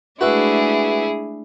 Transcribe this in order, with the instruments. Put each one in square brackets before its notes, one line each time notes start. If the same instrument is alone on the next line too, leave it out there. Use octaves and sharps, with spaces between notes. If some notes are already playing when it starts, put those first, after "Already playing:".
[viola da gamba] G#3 A3 D4 [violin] E4 G#4 [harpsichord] F#4 B4 E5